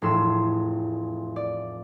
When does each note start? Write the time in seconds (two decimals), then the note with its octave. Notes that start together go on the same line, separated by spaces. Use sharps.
0.02 F1 E2 A2 C6 E6
1.36 D5